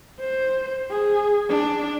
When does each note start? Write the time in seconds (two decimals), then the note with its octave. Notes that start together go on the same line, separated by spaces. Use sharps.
0.20 C5
0.91 G#4
1.49 D4